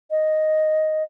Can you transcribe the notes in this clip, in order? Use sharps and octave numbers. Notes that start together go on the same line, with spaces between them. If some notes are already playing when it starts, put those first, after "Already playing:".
D#5